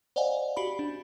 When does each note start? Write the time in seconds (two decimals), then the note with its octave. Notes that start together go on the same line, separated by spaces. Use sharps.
0.16 C5 D5 D#5 F5 F#5 G#5
0.57 F#4 G4 B5
0.79 D4